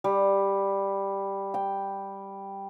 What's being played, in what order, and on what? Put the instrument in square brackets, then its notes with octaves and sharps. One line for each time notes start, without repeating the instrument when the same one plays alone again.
[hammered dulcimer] G3
G5